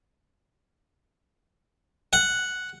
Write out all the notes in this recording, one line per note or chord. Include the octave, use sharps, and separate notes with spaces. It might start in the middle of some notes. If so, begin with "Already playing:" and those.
F#5